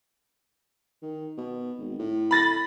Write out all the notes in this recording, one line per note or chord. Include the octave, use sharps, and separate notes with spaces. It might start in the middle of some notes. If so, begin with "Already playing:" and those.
D#3
B2
G#1
A2
B5 A6 A#6